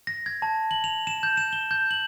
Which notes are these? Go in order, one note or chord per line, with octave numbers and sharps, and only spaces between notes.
A#6
G#6
A5
F#7
F7
E7
G6
E7
G7
G6
F#7